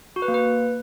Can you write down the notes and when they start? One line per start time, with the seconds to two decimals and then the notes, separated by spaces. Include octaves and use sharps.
0.16 F#4
0.22 B4
0.28 A#3
0.34 B4